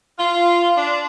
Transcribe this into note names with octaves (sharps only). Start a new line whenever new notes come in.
F4
D4